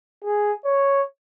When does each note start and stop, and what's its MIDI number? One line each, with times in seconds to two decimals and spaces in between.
0.24 0.53 68
0.65 1.02 73